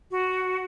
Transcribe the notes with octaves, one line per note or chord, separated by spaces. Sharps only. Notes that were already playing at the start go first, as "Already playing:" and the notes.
F#4